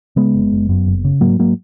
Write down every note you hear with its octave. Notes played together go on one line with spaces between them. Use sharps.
C#3 G#3 B3
F#1
F#1
F#2
F#1
C#3
G#2 F#3 A#3
G#2 F#3 A#3